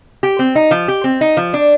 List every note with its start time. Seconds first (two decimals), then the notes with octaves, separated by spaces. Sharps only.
0.23 G4
0.39 C4
0.56 D#4
0.71 F3
0.88 G4
1.04 C4
1.21 D#4
1.37 F3
1.53 D4